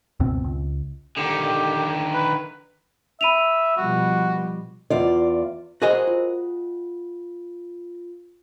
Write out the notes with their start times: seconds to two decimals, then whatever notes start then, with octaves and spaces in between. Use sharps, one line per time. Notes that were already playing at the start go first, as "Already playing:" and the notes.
0.20 C#2 F#2 B2 C4
0.44 C#2
1.17 D3 D#3 G4
2.14 B4
3.21 E5 B5 D#7 F7
3.77 B2 F3 G3 F#4
4.90 E2 F4 D5
5.82 F#4 G#4 A#4 C5 D#5
6.07 F4